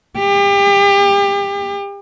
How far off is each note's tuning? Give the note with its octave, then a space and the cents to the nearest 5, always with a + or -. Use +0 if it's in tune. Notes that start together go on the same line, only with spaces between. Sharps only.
G4 +35